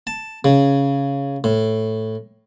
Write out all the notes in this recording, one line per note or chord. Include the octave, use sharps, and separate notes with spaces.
A5
C#3
A2